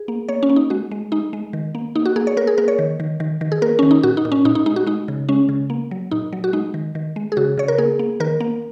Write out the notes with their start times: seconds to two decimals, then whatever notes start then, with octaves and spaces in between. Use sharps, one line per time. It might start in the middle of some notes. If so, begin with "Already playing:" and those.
Already playing: G#4
0.08 A#3
0.28 A#3 C#5
0.43 C#4
0.50 A#3
0.56 D#4
0.70 G#3 F#4
0.91 G#3
1.12 G#3 D#4
1.33 G#3
1.53 D#3
1.75 A#3
1.95 A#3 D#4
2.05 F#4
2.16 A#3 G#4
2.27 C#5
2.37 A#3 A#4
2.47 G#4
2.58 A#3 A#4
2.68 C#5
2.79 D#3
3.00 D#3
3.20 D#3
3.41 D#3
3.52 G#4
3.62 A#3 A#4
3.79 D#3 C#4
3.91 D#4
4.03 A#2 F#4
4.17 D#4
4.25 A#2
4.32 C#4
4.45 A#2 D#4
4.55 D#4
4.66 G#3 D#4
4.76 F#4
4.87 G#3 D#4
5.08 C#3
5.29 G#3 C#4
5.49 C#3
5.70 A#3
5.91 F#3
6.11 A#2 D#4
6.33 F#3
6.44 F#4
6.53 G#3 D#4
6.74 D#3
6.95 D#3
7.16 G#3
7.32 G#4
7.37 C#3 F#4
7.58 C#3 C#5
7.68 A#4
7.78 A#3 G#4
7.99 A#3
8.20 D#3 A#4
8.40 A#3